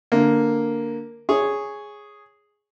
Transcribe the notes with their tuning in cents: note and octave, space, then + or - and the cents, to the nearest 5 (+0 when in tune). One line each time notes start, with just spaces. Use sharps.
D3 +0 A#3 +0
G#4 +0 C#5 +0